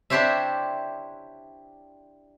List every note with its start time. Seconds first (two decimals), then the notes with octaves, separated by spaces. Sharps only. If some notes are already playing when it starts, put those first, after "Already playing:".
0.10 D4 E4 G4 C5 C#5 E5